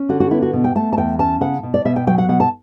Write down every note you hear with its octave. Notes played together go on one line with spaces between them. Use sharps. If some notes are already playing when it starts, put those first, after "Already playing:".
Already playing: C#4
D3 F#4
F#4
B3 E4
F#4
B2
G5
A3 A5
A5
E2 G5
C#4 A5
C#3 F#5
B2
D5
B2 E5
G5
F#3 G5
F#5
B2 F#5
A5